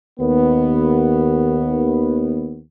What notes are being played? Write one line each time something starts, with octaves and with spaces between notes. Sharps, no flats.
D#2 B3